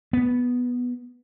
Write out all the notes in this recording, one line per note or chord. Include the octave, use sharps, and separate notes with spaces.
B3